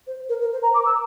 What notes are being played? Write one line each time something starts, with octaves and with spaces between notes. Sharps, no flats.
C5
A#4
A#4
C5
A#5
D6
E6